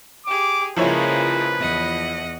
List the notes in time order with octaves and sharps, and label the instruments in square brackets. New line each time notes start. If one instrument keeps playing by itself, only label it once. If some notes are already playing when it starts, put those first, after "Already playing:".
[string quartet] G4 G#4 [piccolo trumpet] D6
[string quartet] C#3 G#3 A#3 [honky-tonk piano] F3 E4 C#5 [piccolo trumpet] B4
[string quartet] E2 D#5 F#5